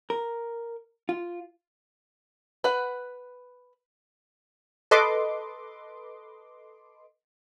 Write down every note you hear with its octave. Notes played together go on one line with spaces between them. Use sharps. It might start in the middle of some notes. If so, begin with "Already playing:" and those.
A#4
F4
B4 F#5
A4 B4 D#5 C6 D6